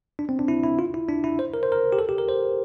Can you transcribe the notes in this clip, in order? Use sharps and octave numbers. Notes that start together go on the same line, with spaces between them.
D4
C4
D4
E4
E4
F4
E4
D4
E4
C5
A#4
C5
A#4
G4
A4
G4
A#4
C5